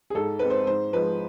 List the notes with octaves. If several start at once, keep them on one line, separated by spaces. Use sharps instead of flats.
G#4
G#2 A4
G#3 C4 B4
C5
G#2 C5
F3 G#3 B4